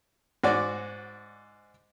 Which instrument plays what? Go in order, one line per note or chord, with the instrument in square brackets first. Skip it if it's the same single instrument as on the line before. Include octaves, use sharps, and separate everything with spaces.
[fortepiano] G#2 F#4 D5